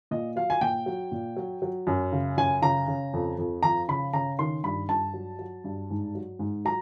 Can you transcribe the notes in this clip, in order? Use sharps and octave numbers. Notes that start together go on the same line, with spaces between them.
A#2 D#5
F#3 F5
G#5
A#2 G5
F#3
A#2
F#3
F#3
F#2
C#3
F#2 G#5
C#3 A#5
C#3
F2
F2
F3 A#5
C#3 B5
C#3 A#5
D#3 C6
G2 B5
G2 A5
F#3
F#3
G2
G#2
F#3
G#2
F#3 A#5